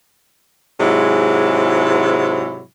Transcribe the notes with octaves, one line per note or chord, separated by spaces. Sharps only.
G#2 C3 F#3 G#3 E4